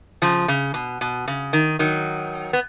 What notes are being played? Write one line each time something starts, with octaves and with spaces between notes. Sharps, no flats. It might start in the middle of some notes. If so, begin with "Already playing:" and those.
C#3 F3
C#3
B2
B2
C#3
D#3
D#3 F#3
B3